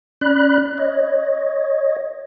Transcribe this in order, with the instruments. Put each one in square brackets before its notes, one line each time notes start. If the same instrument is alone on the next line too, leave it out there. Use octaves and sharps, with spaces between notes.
[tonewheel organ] C#4 D5 B5 F#6
C#5 D#5